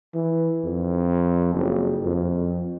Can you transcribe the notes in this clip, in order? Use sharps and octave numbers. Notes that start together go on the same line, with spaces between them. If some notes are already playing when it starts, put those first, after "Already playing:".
E3
F2
F#1
F2